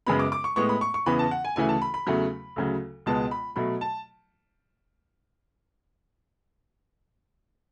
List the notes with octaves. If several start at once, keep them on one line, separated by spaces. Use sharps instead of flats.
F#2 C#3 G#3 B3 B5
D6
D6
C#6
A2 G#3 B3 C#6
B5
C#6
C#6
E2 C#3 E3 B3 B5
A5
F#5
G#5
D2 C#3 E3 A3 G#5
A5
B5
B5
E2 C#3 F#3 A3
D2 C#3 F#3
C#2 B2 G#3 B3 A5
B5
B2 F#3 A3 B5
A5